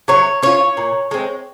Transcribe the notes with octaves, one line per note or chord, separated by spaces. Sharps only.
F#3 C#5
C#4 F4 C#5
A#2
G#3 C4